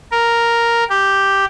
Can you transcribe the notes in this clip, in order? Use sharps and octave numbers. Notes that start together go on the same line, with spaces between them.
A#4
G4